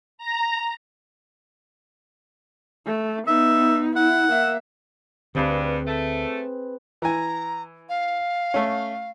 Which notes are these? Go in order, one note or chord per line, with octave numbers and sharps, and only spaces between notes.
A#5
A3
B3 D#4 E5
E4 F#5
A#3 E5
D2 G2 D3 C4 G#4 B4
A3
E3 G#5 A#5
F5
A3 C#4